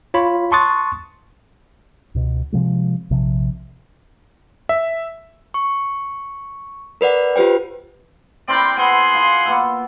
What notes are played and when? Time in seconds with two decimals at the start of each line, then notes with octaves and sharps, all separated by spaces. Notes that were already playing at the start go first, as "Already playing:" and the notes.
0.14 F4 C#5 B5
0.52 A5 C6 C#6 D#6 F#6 A6
2.15 C#2 B2
2.52 C3 F3 G#3
3.10 A#1 C3 F3
4.69 E5
5.54 C#6
7.01 A#4 B4 D5 F#5
7.36 F4 G4 B4 C5 G5
8.48 C4 E4 A#4 D5 G5 C6
8.77 B3 G#4 F#5 C6
9.14 F4 A#4
9.45 A#3 B3 E5